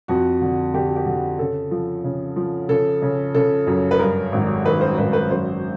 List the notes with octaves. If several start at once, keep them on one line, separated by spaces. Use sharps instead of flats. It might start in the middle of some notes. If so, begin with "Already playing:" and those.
F2 F#4
D3
D3 G4
F#4
G4
D3
C#3 A4
F3
C#3
F3
C#3 A4
C#3
C#3 A4
F#2
B4
G2 A#4
G#1
D#3 B4
C5
G#1 B4
B4
F#2 C5